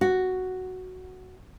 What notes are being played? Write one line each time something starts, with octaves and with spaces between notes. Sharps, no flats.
F#4